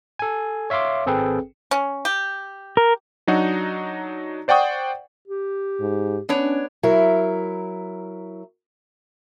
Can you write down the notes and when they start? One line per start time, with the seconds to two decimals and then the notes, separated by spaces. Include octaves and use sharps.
0.19 A4 G#5
0.70 C#5 E5 F5 C6 D6
1.06 G#1 C4 G#4 A4 B4 G5
1.71 C#4
2.05 G4
2.77 A#4
3.27 F#3 D4 D#4 F#4
4.48 C5 D5 F#5 G5 C#6 D#6
5.28 G4
5.80 G#2
6.29 B3 C#4 D4 C#5
6.83 F#3 E4 A#4